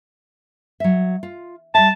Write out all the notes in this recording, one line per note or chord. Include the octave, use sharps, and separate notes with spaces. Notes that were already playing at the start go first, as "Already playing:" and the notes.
F#3 E5
F4
G3 E5 A5